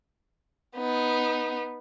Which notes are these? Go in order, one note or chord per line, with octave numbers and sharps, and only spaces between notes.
B3 D#4